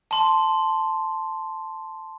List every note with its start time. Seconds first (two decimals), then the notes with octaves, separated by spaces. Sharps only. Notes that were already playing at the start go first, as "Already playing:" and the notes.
0.11 A5 C6